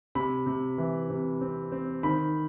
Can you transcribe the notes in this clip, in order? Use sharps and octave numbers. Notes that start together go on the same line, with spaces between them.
C3 B5
C3
E3
C3
C4
C4
D#3 B5